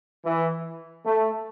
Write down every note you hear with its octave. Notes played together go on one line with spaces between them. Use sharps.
E3
A3